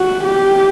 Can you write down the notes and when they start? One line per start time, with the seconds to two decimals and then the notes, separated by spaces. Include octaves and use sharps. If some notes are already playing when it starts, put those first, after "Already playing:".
Already playing: F#4
0.24 G4